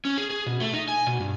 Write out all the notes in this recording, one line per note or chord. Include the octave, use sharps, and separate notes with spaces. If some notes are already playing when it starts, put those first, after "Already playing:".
C#4
G#4
G#4
B2
A3
D#4
G#5
B2
G2